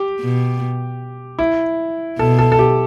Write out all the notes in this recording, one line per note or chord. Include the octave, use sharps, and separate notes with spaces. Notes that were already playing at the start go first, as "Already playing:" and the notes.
Already playing: G4
B2
E4
B2 A4
A4
A4
G4